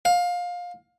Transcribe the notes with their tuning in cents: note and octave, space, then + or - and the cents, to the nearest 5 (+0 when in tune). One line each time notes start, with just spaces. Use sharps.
F5 +20